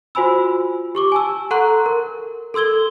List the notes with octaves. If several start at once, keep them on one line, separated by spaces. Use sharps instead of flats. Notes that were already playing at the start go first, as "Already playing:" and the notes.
F4 F#4 C5 G#5 B5 E6
G4 C#6 D6
G#5 A5 E6
A4 F#5 A#5 C6 C#6 F#6
A#4
A4 C6 E6 G#6 G7